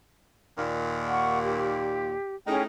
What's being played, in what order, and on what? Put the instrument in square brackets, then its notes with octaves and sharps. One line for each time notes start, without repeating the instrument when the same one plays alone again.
[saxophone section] D#2 A#2
[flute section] F#5 C#6
G4
[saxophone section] A2 D#4 [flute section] C#4 G#4 G5